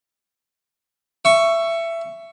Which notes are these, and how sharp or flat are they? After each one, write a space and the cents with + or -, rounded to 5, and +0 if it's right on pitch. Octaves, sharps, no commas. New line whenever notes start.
E5 +20 C#6 +5